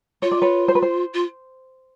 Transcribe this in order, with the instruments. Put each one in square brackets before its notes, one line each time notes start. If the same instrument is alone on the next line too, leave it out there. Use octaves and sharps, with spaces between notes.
[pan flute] F4 [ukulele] C#5
[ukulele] D5
B4 C#5
C5
B4
C5
[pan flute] F4